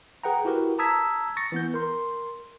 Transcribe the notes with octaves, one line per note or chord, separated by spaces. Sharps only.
G#4 B4 F#5 G5 A#5
E4 F#4 G4 A#4 B4
A5 A#5 D#6 E6 G#6 B6
C#6 A6 A#6 C#7
E3 B3 G6
A#4 C6